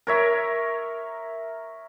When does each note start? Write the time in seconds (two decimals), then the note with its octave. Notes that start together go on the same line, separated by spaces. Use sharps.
0.07 A#4 C#5 E5